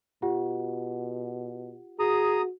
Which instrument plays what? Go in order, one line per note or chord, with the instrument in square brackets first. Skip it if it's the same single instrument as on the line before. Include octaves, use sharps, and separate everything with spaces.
[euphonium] B2 [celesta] F4 G4 F#5
[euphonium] F#4 [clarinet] G#4 [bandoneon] A#5 D#6